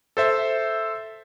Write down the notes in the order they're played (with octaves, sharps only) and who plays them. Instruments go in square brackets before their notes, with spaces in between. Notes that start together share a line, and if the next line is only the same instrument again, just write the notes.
[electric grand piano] A4 C5 E5